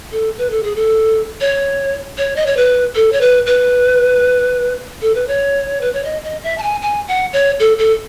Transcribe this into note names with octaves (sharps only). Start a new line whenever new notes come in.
A4
B4
A4
G#4
A4
C#5
C#5
D#5
C#5
B4
A4
C#5
B4
B4
A4
B4
C#5
B4
C#5
D#5
D#5
E5
A5
G#5
G#5
F#5
C#5
A4
A4